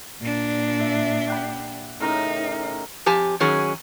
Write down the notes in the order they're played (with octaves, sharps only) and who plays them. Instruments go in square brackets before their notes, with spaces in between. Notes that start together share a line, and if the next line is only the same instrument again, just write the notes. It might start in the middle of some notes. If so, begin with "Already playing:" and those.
[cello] A#2 D4
[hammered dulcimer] E5
G4 F#5 B5
[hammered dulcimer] A2 C#3 A#4 [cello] D#4
[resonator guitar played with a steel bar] F2 G4 G#5 A5
D#3 F#3 C#4 G#4